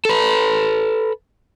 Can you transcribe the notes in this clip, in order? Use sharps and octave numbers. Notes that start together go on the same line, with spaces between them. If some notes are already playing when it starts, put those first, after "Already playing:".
A4 B4